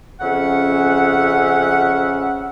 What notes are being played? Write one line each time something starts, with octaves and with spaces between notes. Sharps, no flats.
F2 C#3 C#4 E5 F#5